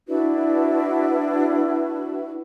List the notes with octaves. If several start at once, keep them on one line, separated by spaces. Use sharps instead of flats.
D4 E4 F#4 B4